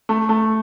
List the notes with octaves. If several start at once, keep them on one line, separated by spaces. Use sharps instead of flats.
A3
A3